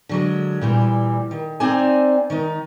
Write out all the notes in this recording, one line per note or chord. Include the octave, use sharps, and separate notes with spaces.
D3 F#3 G#3
A#2 E3 G3
D#3
C4 D#4 C5 D5 G#5
D#3 D#4